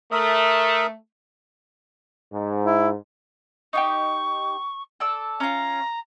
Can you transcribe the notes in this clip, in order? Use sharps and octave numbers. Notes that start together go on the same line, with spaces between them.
A3 A#4 E5 D#6
G#2
E4
D#4 F4 G4 C#6
A4 D5 E6
C#4 F4 A#5